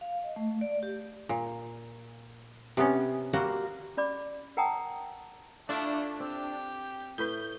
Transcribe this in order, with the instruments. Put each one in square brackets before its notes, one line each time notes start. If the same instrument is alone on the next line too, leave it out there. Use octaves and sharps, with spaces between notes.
[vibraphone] F5
D#5
A3
D5
G4
[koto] A#2
C3 B3 C#4
G3 A#3 F#4 C5
[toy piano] C#4 D5 B5 D6
A#4 F#5 G5 A5 A#5 D#6
[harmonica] A3 E4 [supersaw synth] D4 [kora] F4 A4
[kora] C4 [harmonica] G4
[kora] A2 B4 [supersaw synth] G6